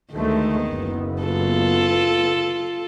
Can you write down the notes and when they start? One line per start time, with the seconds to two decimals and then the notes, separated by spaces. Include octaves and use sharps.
0.12 D2 D#3 G#3 A3
0.63 F#1 B3
1.22 F4 A4